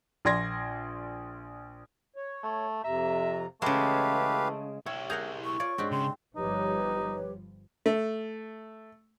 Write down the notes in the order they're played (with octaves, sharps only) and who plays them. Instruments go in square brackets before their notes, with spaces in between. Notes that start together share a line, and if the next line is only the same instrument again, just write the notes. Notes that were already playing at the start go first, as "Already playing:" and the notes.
[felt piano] A#1 D5 C6 G#6 A#6
[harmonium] C#5
[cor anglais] A3
[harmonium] F2 C3 A#5 [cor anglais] E5
[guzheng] C#3 G#3 [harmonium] E3 [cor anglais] A3 [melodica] G4 B4 F5
[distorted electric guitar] E4 G4 [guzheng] C#5 [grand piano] E6
[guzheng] G#4 A#4 F#5 [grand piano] G6 F7
[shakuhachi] C#6
[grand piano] F4 [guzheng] C#5 D5
[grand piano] G#2 G#3 D4 [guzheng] C4 F#4 G4
[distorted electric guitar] C#3 [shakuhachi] C6
[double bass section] G1 F3 G3 [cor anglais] D#4 [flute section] G4 B4 C#5
[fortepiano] A3